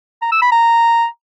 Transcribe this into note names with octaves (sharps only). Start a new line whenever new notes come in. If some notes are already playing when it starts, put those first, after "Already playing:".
A#5
E6
B5
A#5